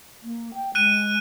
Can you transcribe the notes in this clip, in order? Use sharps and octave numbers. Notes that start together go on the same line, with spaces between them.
A#3
G5
G#3 F#6 D#7